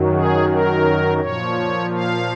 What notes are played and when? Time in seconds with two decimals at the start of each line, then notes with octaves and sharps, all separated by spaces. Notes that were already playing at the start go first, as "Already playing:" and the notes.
Already playing: F#2 D#3 F#3
0.12 G#4
0.49 A#4
1.21 A#2 F3 C#5
1.93 F5